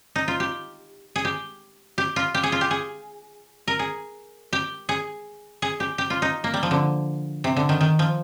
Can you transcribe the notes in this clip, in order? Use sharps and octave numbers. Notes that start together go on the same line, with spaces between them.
D#4
F4
G4
G#4
G4
G4
F4
G4
G#4
F4
G4
G#4
A#4
G#4
G4
G#4
G#4
G4
G4
F4
D#4
A#3
G3
F3
D3
C3
D3
D#3
D#3
F3